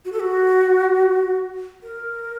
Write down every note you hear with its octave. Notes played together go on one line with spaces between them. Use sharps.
F#4
A4
F#4
A#4